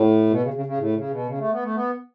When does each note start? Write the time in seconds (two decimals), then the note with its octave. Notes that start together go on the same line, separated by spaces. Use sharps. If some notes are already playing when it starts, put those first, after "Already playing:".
Already playing: A2
0.30 B2
0.42 C#3
0.54 C#3
0.66 C#3
0.78 A2
0.95 C#3
1.10 B2
1.26 C#3
1.38 A3
1.51 B3
1.63 A3
1.74 B3